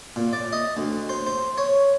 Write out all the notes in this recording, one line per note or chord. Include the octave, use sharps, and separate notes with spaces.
A#2
D5
D#5
D2
C5
C5
C#5